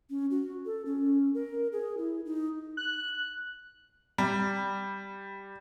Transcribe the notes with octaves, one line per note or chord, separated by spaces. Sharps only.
C#4
F#4
A4
C#4
A#4
G#4
E4
D#4
F#6
G3